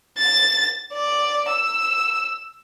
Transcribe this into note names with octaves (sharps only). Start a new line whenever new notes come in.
A6
D5
E6